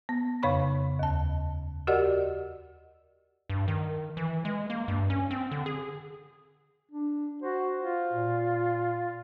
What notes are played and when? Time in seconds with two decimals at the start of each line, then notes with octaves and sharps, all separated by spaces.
0.09 B3
0.43 F2 C#3 C#5 B5 C#6
0.99 D#2 A5
1.87 F#4 G4 A#4 D5 D#5 F#5
3.49 G2
3.68 D#3
4.17 E3
4.45 G#3
4.70 A#3
4.88 G2
5.10 C#4
5.31 C4
5.51 D3
5.66 G#4
6.91 D4
7.42 F#4 C5
7.81 F4
8.13 A#2